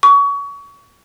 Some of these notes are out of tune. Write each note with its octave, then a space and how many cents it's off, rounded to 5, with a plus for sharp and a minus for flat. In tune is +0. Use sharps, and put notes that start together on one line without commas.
C#6 +30